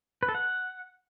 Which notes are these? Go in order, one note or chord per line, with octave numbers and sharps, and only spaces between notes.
B4
A4
F#5